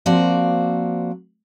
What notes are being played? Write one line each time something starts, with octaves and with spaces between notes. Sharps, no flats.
F3 A#3 C4 F#4 D5